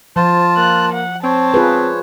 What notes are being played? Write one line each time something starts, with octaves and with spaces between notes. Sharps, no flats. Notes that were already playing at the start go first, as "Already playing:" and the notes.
F3 F4 C5 A5
A#3 F#6
F#5
C4 C5 C#5 A5
F4 G#4 B4